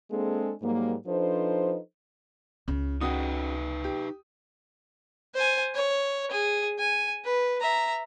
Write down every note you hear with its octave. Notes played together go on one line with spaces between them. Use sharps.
G#3 A#3 C4 D4 G#4 A4
G#2 F#3 G3 A#3
F3 D4 D#4 A4 B4 C5
C#2 C#3
C#3 D#4 F#4 B4 G5 D#6
G4
C5 G#5
C#5
G#4
G#5
B4
E5 A#5